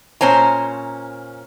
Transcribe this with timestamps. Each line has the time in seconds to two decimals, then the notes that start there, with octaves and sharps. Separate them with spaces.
0.21 A#2 C#4 C5 G#5 A#5